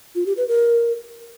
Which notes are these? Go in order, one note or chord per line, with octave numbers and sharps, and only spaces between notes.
F4
G4
B4
A#4